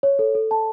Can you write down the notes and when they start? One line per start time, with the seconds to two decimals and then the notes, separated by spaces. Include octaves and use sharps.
0.03 C#5
0.19 A4
0.35 A4
0.51 A5